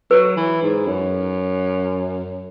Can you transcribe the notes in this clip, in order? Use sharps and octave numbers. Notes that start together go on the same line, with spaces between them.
F#3 B4
E3
G#2
F#2